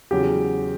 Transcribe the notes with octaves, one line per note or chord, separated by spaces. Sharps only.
E2 C#3 F#3 G4